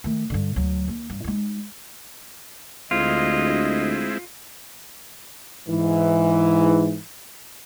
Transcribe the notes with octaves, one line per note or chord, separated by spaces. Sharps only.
D#3 A3
G2 D3
D2 F#3
D#2
G2
G#3 D#4
D2 G#3 C4 E4 F4 D#5
G#2 E3